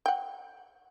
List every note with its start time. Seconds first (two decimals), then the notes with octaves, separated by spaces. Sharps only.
0.06 F#5 G5